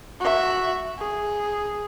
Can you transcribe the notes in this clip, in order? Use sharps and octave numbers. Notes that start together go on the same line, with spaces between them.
F#4 E5
G#4